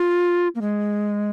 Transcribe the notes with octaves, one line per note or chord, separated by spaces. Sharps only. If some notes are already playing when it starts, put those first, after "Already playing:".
Already playing: F4
A#3
G#3